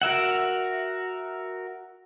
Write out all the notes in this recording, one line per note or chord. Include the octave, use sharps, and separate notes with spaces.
F#4 A#4 E5 F#5